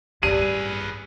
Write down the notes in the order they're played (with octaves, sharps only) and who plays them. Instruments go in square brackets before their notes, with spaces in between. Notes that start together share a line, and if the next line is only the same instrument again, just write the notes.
[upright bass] A1 G2 [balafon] G4 D5 [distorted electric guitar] G#4 B4 [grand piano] D#7